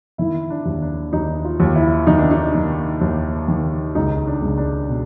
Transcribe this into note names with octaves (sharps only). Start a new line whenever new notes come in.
D#3 E4
D4
D#2
D4
D#2 D#4
F4
D#2
E4
D#3 D#4
D4
D#4
D#3
D#2
D#3
C#2 D#4
D4
C#2
D4
B2